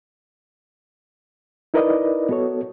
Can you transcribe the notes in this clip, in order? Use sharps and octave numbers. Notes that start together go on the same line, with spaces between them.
D#4 E4 A#4 B4 D5 D#5
B3 F#4 A4 C#5